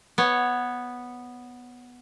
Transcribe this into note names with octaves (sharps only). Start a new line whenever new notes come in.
B3 C#5